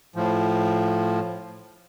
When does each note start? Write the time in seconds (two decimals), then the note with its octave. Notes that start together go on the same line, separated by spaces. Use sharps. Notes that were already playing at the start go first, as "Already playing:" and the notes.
0.16 A2 F3